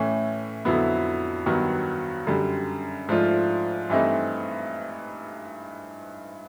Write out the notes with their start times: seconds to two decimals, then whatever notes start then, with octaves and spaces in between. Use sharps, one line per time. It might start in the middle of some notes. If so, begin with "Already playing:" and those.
Already playing: A2 E3 A3 C#4
0.65 F2 D3 F#3 B3 E4
1.46 G2 D#3 F#3 B3
2.27 F#2 D3 G3
3.09 G#2 F3 A3 D4 F4
3.89 G2 E3 A3 C4 D#4